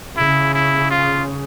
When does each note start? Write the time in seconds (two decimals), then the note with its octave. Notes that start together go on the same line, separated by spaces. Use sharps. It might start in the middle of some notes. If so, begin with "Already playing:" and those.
0.16 C#3 E4
0.54 E4
0.90 F4